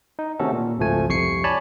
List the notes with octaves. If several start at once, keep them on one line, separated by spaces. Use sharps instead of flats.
D#4
C3 D#3 A3 C#4 F#4 A4
A#2
G#1 C#2 F3 A3 G#5
C2 F2 C3 C#6 C7 C#7
C#5 D5 G#5 A5 B5